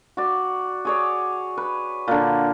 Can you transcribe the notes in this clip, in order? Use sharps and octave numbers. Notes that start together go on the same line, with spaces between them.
F#4 D5
G#4 C#5 D5
B4
A#2 D3